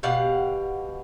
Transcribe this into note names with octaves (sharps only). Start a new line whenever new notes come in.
B2 G4 F5 F#5